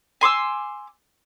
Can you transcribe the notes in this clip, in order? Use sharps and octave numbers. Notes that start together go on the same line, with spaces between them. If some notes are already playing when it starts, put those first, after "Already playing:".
G#5 C6 D6 E6